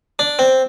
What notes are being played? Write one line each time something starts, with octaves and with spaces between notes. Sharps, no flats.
D4
C4